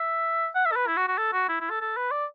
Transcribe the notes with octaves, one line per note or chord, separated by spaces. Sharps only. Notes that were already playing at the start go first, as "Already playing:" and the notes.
Already playing: E5
F#5
E5
A4
B4
E4
F#4
F#4
A4
F#4
E4
E4
A4
A4
B4
D5